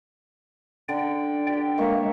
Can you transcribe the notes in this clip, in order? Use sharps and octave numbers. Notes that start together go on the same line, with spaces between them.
D3 D5 G5
G4 G5
G#3 A#3 C#5 E5 C#6